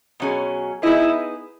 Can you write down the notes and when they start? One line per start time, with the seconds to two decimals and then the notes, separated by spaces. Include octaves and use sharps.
0.20 B2 F#3 C#4 G#4
0.83 B3 D#4 E4 G#4 D#5